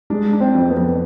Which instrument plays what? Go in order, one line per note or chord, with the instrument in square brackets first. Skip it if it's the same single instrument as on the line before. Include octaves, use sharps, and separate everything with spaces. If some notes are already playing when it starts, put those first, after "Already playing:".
[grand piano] G#3 [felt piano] D4
[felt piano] D4
[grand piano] C4
[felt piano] F2
[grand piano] B3
[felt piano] F2